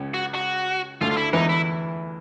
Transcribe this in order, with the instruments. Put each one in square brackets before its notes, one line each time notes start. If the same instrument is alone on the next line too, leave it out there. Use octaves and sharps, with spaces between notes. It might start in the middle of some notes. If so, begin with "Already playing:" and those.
Already playing: [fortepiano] C#2 C#3
[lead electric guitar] F#4
F#4
[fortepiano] D2 D3 [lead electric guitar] F4
[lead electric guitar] F4
E4
[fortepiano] E2 E3 [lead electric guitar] D#4
[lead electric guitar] E4